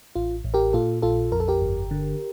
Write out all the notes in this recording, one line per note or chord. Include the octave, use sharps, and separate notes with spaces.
A1 F4
A1
G4 A#4
A#2 F4 A4
A#1 F4 A4
F2 A#4
A4
G4 A#4
G1
D3